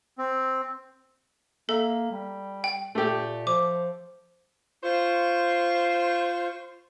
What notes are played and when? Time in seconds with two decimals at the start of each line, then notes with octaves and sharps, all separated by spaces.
0.18 C4
1.69 A#3 A4 E5
2.11 G3
2.64 G5
2.95 A#2 A3 G4
3.47 F3 D6
4.84 F4 C5 C#6